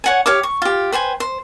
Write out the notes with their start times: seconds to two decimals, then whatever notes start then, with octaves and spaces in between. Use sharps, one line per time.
0.04 C#5 F#5 G#5
0.26 G4 C#5 F5 D6
0.43 C#6
0.62 F4 G4
0.92 B4 C5 G5 G#5
1.20 C5